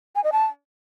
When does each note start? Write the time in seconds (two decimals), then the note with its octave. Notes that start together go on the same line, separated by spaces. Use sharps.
0.15 G#5
0.24 D#5
0.32 A5